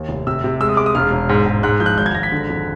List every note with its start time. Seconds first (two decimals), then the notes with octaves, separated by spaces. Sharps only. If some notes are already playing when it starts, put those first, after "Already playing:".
Already playing: D#2
0.09 F1
0.27 C3 E6
0.44 C3
0.61 G#3 E6
0.69 D#6
0.77 G#3 D6
0.86 D#6
0.95 E1 F6
1.12 E1
1.29 G#2
1.46 G#2
1.63 G#2 F#6
1.80 F3 G6
1.86 F#6
1.97 G#1 G6
2.06 G#6
2.15 G#1 A#6
2.23 B6
2.32 D3
2.49 F2